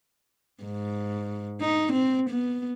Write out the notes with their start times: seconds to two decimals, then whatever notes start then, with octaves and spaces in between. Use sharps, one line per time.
0.63 G#2
1.61 D#4
1.93 C4
2.30 B3